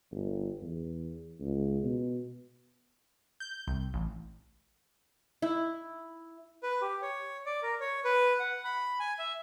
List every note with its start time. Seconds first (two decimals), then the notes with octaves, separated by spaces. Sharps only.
0.11 G1
0.63 E2
1.41 C#2
1.84 B2
3.40 G6
3.67 C2
3.94 A1
5.42 E4
6.62 B4
6.81 G4
7.02 C#5
7.46 D5
7.63 A#4
7.81 C#5
8.05 B4
8.39 F#5
8.65 B5
9.00 G#5
9.19 E5